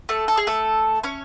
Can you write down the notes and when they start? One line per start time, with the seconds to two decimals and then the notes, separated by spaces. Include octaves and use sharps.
0.09 A3 A4
0.28 A4
0.37 G#4
0.47 A3 A4
1.03 C#4 C#5